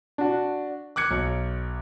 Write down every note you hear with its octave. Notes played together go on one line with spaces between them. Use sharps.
D4 F#4
D6 F#6 G#6 C#7
B1